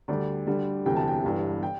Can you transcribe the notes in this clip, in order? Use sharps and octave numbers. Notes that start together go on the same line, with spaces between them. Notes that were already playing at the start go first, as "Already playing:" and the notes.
D2 D3 G3 D5
D2 D3 G3
E1 D2 C3 E3 G5
A5
G5
G1 G2 E3
G5